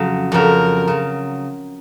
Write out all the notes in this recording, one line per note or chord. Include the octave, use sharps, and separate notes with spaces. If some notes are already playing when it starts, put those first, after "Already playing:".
Already playing: F2 C#3 F#3
F2 C#3 F#3 A#4
C#3 F#3